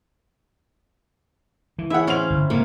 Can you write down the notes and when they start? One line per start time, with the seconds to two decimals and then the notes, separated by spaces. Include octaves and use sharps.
1.79 E3
1.90 E4 G#4 C#5 E5 F#5
2.07 A2 C#4 C5 F5 F7
2.30 G1
2.50 G#2 C3 A#3